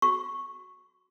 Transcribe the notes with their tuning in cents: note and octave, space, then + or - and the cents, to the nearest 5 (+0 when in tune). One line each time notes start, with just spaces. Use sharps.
F#4 -5 C#6 -10